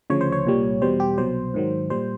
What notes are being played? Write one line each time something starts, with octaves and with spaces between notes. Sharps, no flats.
D2 C#3 F3 C#5
C5
C#5
C2 A#2 G3
E2 B2 G3 C5
G4
C2 B2 F#3 C5
G#2 D#3 F#3
A#2 G3 C5